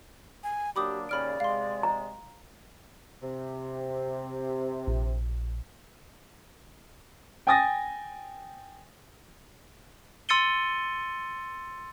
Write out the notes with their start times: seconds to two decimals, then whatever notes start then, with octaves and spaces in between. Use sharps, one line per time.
0.43 G#5
0.76 F#3 A#3 D4 G4 B5 D6 D#6
1.09 D#2 C#3 D5 B5 F6 D7
1.40 C3 G#3 F5 C6
1.83 A#5
3.22 C3
4.87 A#1
7.47 G5 G#5 D#6 A6 A#6
10.29 C6 E6 A6 C#7 D#7 G7